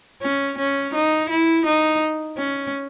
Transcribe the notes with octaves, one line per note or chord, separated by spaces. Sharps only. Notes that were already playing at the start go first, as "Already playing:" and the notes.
C#4
C#4
D#4
E4
D#4
C#4